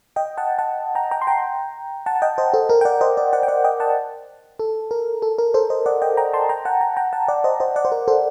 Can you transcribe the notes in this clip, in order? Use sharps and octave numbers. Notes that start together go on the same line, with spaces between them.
D#5 G5
F#5 A5
F#5 A5
G5 A#5
G5 A#5
C6
G5 A#5
F#5 A5
D#5 G5
C5 D#5
A4 C5
A#4
G5
D5 F#5
C5 D#5
A#4 D5
D5 F#5
G5
D5 F#5
D#5 G5
F#5 A5
A4
A#4
A4
A#4
A4 C5
C5 D#5
D5 F#5
D#5 G5
G5 A#5
A5 C6
G5 A#5
F#5 A5
G5 A#5
G5 A#5
F#5 A5
D5 F#5
C5 D#5
C5 D#5
D5 F#5
C5
A#4
A4 C5